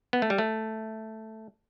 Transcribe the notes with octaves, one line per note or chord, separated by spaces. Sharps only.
B3
A3
G3
A3